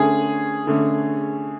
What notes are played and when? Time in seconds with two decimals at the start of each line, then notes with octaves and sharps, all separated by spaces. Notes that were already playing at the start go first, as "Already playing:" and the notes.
Already playing: D3 A3 C#4 G#4
0.67 D3 A3 C#4